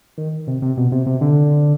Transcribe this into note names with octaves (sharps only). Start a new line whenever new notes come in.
D#3
C3
C3
B2
C3
C3
D3